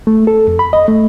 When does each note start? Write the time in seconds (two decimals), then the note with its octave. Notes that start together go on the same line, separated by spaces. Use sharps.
0.07 A3
0.27 A4
0.48 F2
0.59 B5
0.73 D#5
0.88 A3